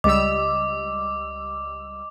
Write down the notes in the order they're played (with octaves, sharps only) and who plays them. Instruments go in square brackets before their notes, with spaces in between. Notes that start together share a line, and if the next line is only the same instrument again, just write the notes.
[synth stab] C#2 G3 E6 [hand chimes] D#5 [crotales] D6